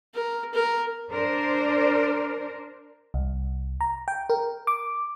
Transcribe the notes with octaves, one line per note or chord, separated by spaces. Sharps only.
A#4
A#4
D4 A#4 C5 D5
C2
A#5
G5
A#4
D6